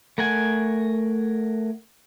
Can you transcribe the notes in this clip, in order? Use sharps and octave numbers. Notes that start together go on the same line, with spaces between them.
A3 A#4 F#5 G#5